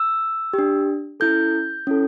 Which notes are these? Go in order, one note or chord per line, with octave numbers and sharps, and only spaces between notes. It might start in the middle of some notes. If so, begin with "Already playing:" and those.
Already playing: E6
G4
D4
C#4 E4 A4 G6
C#4 E4 A4